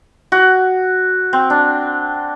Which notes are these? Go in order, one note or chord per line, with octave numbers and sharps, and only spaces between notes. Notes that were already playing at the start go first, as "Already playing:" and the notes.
F#4
C4
D4